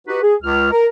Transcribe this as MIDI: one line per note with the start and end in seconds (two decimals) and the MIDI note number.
0.08 0.22 63
0.08 0.22 66
0.08 0.22 67
0.08 0.22 71
0.23 0.35 68
0.43 0.72 37
0.43 0.72 89
0.72 0.87 70